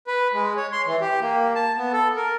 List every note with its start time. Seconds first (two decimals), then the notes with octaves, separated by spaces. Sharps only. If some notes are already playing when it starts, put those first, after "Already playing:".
0.07 B4
0.33 G#3
0.57 C#5
0.72 C6
0.86 E3
1.01 G4
1.21 A#3
1.55 A5
1.77 B3
1.93 A4
2.16 A#4